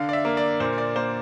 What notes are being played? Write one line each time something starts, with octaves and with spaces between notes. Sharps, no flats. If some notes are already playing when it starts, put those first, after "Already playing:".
Already playing: D3 F5
D5
E5
A#3
D5
A#2 C5
D5
A#3 C5